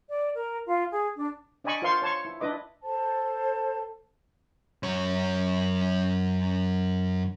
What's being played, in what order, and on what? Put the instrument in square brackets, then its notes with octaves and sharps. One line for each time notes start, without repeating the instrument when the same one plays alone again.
[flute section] D5
A#4
F4
G#4
D4
[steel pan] D4 D5 D#5 G#5 B5 C#6
F4 A#4 C5 F5 C6 C#6
C#5 A5 C6 C#6
E4
D4 E4 B4 D#5 D6
[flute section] A4 C5 A5
[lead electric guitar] F#2 C#5